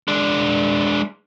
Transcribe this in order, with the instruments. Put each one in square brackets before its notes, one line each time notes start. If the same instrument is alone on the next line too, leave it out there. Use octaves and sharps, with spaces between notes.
[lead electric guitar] G#3 D4